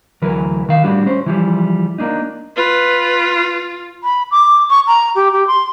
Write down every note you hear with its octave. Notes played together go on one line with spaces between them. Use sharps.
D2 E3 F#3 A#4 B4
D#3 F5
A2 G3 D4 F#4
C#4 C5
E3 F3 G3
A#3 D4 D#4
F4 B4
B5
D6
C#6
A#5
G4
G4
C6